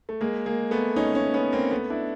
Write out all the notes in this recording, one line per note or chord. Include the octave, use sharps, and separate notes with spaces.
A3
G#3 A#3
G#3 A#3
A3 B3
C#4 D#4
C#4 D#4
B3 C#4
A#3 C4
A3 B3
D4 E4